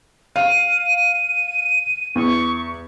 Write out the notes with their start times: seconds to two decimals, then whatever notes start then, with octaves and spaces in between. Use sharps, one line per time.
0.36 F5 D#7
2.15 E2 C#6